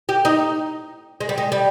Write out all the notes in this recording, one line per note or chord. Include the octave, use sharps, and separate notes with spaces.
G4
D#4
G#3
G3
G#3
G3